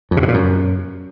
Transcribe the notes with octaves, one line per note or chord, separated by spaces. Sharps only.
F2
C3
B2
A#2
F#2